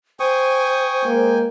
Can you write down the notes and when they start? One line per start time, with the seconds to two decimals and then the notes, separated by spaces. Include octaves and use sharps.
0.20 C5 G5 G#5 C#6 D#6
1.04 G#3 A#3